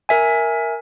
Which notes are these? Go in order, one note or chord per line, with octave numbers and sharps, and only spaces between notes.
A#4 E5 G#5